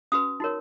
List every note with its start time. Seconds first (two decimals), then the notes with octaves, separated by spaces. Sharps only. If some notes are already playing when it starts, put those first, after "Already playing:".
0.12 C#4 F#4 B4 D#6
0.40 D#4 F#4 A#4 C#5